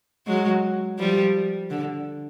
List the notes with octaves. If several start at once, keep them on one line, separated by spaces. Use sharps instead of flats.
F#3 G#3
F3 G3
D3